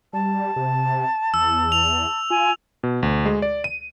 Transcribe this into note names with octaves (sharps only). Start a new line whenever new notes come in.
G3 A5
C3
E2 E6
F7
F4 G#5
B2
D2
G#3
D5
D#7